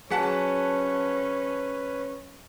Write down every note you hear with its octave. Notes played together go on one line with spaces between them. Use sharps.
F#3 C#4 G#4 B4 F#5 G#5 A5 B6